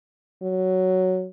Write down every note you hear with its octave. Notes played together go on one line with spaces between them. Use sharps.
F#3